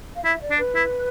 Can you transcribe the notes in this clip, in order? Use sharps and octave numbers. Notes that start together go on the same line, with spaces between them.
F5
E4 E5
D5
D4
B4
E4